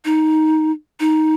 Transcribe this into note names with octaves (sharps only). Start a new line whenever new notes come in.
D#4
D#4